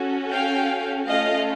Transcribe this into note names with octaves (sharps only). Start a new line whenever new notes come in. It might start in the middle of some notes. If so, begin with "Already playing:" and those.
Already playing: C#4 F#4 A4
F5 G5
A3 C#4 F4 A4 D#5 F5